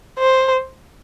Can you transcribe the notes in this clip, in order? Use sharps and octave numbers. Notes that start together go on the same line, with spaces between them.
C5